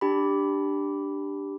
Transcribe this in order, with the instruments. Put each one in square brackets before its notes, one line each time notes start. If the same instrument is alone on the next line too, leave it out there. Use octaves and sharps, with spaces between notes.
[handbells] D4 G4 B5